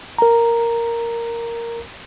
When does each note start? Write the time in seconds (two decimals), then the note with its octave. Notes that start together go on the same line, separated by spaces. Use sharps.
0.18 A#4 A#5